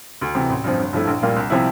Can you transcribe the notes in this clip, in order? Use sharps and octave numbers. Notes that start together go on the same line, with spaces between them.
D2
C3 E3
A1
G2 F3 C4
G1
G2 F3 A3 E4
A#1
A#2 G3 A#3 F4
C2
C3 F3 C4 E4